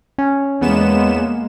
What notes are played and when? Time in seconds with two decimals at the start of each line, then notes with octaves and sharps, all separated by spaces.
0.18 C#4
0.61 E2 G#3 A#3 B3 E7